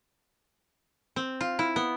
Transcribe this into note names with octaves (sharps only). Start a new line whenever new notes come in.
C4
F4
E4
B3